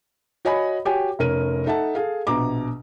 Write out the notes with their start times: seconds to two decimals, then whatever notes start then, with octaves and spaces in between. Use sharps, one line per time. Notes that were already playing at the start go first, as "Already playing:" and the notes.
0.45 F#4 C#5 D#5 G#5 B5
0.85 F#4 G4 C#5 G5 G#5
1.19 F1 C#4 A#4 D#7
1.66 D#4 A4 E5 F#5 A5
1.95 G#4 A4 F5
2.27 A#1 B2 A#5 D6